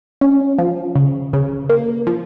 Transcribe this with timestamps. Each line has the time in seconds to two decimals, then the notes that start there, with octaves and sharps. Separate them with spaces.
0.21 C#4
0.58 F3
0.95 C#3
1.33 C#3
1.69 A#3
2.07 F3